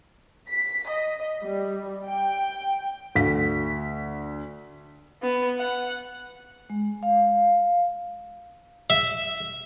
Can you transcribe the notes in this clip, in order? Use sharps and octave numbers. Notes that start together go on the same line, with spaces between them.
B6
D#5
G3
G5
D2 B6
B3
F#5
G#3
F5
E5